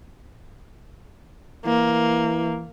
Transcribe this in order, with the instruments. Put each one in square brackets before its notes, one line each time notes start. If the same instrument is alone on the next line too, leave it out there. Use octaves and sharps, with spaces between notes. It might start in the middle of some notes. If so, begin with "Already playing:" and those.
[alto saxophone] E3 [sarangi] A#3